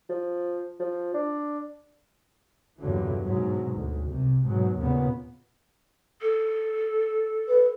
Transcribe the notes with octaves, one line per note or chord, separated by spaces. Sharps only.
F3
F3
D4
E2 G2 A#2 D3 E3 F#3
G#2 B2 F#3
D2
C2 C3
G#2 B2 F#3
D#2 A#2 C#3 B3
A4
B4